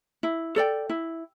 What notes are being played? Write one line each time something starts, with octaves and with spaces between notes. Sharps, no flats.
E4
A4 D5 G5
E4